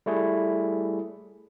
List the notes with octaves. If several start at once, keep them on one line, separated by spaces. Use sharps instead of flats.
G3 A3 E4 G#4